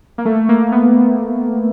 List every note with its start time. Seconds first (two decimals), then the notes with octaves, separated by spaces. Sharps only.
0.18 A#3
0.25 A3
0.49 A#3
0.72 B3